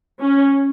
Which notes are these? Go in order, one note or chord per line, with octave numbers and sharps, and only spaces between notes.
C#4